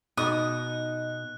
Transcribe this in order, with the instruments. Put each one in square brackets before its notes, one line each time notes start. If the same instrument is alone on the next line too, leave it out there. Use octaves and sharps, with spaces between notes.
[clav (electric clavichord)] B2 [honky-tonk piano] D#4 [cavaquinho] D#6 [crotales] F#6